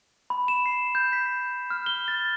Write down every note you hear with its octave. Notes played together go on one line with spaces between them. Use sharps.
B5
E7
C7
G6
B6
F6
G7
A6